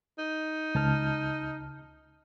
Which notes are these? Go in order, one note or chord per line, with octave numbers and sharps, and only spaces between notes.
D#4
C#2 A5 F6